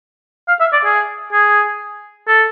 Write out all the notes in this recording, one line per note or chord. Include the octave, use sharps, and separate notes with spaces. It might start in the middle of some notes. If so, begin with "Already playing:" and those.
F5
E5
D5
G#4
G#4
A4